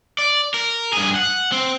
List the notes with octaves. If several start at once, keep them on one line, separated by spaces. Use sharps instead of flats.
D5
A#4
G2 G#4
F#5
C4